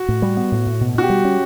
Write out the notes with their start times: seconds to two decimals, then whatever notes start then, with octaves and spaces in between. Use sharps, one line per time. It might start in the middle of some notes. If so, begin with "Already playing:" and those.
Already playing: F#4
0.08 A2
0.22 G3
0.37 B3
0.52 A2
0.66 A2
0.81 B2
0.95 B2 F#4
1.03 G4
1.10 G3
1.25 C#4